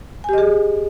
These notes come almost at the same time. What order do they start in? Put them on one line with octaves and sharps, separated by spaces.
G#5 G4 D#5 G#4